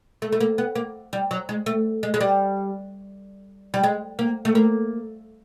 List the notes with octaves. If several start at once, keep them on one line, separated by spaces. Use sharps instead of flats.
A3
A3
A#3
B3
A#3
G3
F#3
G#3
A3
G#3
G#3
G3
G3
G#3
A#3
A3
A#3